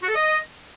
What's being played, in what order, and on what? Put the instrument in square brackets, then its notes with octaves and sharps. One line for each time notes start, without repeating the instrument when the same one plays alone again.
[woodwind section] F#4
A4
D#5